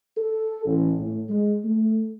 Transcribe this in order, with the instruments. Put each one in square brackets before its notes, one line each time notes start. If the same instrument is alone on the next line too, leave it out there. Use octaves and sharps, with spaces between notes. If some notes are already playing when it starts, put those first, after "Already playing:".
[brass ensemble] A4
A1
A2
G#3
A3